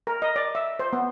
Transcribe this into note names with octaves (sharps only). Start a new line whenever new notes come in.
A#4
D#5
D5
E5
C5
B3